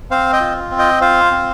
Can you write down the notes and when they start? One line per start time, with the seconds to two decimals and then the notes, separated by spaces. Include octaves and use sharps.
0.11 C4 C5 F5
0.33 D#5 G5
0.41 F4
0.71 C4
0.79 D#5 G5
1.01 F4 C5 F5
1.31 C4